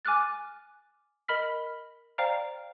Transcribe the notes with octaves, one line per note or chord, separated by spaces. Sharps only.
G#5 D6 F6 F#6 A6
A#4 D#5 B5 F6 B6
C5 D5 F5 G5 A#5 F6